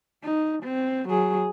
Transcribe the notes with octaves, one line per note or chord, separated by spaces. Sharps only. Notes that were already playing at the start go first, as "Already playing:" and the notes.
D#4
C4
F#3 G#4